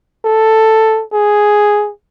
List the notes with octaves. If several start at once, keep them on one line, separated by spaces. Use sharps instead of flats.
A4
G#4